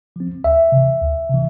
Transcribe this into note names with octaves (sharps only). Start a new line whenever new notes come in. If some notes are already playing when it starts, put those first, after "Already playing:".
F3 C4
D2 E5
C3 E3
D2
C3 E3